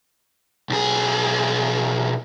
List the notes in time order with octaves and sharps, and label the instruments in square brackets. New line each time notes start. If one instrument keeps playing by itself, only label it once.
[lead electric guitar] B1 G#4